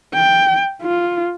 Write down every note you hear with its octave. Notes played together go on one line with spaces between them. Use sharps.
G5
F4